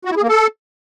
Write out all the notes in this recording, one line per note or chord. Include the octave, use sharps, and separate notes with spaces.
F#4
E4
G#4
A#3
A4